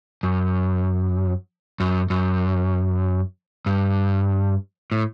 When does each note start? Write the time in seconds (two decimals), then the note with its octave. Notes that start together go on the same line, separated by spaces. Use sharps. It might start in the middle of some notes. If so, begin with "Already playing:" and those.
0.23 F#2
1.80 F#2
2.10 F#2
3.66 G2
4.92 A2